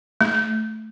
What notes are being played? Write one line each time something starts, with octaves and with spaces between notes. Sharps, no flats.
A3